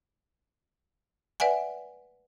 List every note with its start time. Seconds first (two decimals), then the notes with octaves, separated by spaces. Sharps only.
1.40 B4 D5 E5 F#5 G#5